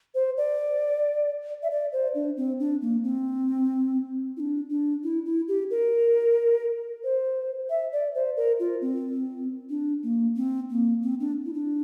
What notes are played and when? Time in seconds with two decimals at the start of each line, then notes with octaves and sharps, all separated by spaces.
0.15 C5
0.37 D5
1.63 E5
1.70 D5
1.93 C5
2.14 D4
2.37 C4
2.60 D4
2.82 A#3
3.04 C4
4.37 E4
4.40 D4
4.70 D4
5.04 E4
5.26 E4
5.48 G4
5.71 A#4
7.04 C5
7.70 E5
7.92 D5
8.15 C5
8.37 A#4
8.60 F4
8.82 C4
9.70 D4
10.03 A#3
10.36 C4
10.70 A#3
11.03 C4
11.20 D4
11.46 E4
11.54 D4